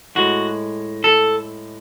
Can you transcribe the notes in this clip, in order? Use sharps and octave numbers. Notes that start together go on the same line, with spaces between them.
A2 G#3 F#4
A4